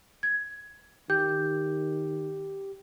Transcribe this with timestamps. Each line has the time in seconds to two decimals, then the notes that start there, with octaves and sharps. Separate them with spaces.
0.23 G#6
1.10 D#3 G4 G6